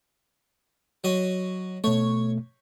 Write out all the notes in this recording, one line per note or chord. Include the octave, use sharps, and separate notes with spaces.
F#3 D#5
B2 A3 C#5